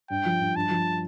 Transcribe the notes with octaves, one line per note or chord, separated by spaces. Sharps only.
G2 G5
F3
G2
G2 A5
F3